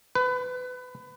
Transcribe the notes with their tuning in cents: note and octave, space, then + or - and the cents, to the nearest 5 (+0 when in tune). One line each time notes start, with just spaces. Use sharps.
B4 +25